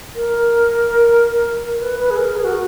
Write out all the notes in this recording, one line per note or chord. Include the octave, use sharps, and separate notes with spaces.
A#4
A#4
B4
B4
G#4
A#4
G#4
F#4